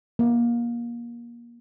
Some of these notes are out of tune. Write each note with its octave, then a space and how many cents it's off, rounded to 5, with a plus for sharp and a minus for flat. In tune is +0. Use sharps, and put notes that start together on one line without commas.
A#3 +25